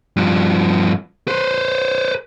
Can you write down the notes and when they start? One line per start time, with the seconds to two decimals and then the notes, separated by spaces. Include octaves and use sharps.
0.17 G2 F3
1.28 B4 C5